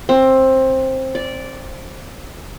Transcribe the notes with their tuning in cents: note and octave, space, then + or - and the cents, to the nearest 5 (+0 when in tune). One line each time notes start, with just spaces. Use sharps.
C4 +15
D5 -10